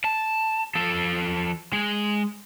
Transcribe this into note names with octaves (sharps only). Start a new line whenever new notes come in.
A5
F3 A4
G#3